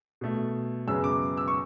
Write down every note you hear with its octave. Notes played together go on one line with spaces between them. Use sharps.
B2 A3
F#2 C#3 G#3 B3 E6
D6
E6
C#6